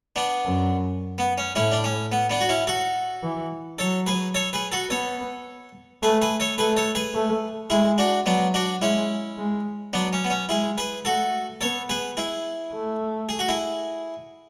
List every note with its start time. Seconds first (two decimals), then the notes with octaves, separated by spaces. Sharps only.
0.16 B3 D4
0.44 F#2
1.18 B3
1.38 C#4
1.55 A2 C#4 E4
1.72 D4
1.84 C#4
2.12 B3
2.30 B3 D4
2.40 F#4
2.49 C#4 E4
2.67 F#4 A4
3.23 E3
3.79 F#3 A4 C#5
4.06 G#4 B4
4.35 A4 C#5
4.53 G#4 B4
4.72 F#4 A4
4.90 B3 A4 C#5
6.03 A3 G#4 B4
6.22 G#4 B4
6.40 A4 C#5
6.58 A3 G#4 B4
6.77 A4 C#5
6.95 G#4 B4
7.14 A3
7.70 G#3 E4 G#4
7.98 D4 F#4
8.26 F#3 B3 D4
8.54 D4 F#4
8.82 G#3 C#4 E4
9.38 G#3
9.93 F#3 B3 D4
10.13 C#4
10.24 B3
10.30 C#4
10.49 G#3 E4 G#4
10.78 G#4 B4
11.05 A3 F#4 A4
11.61 B3 A4 C#5
11.89 G#4 B4
12.17 E4 G#4
12.73 A3
13.29 G#4
13.39 F#4
13.49 E4 G#4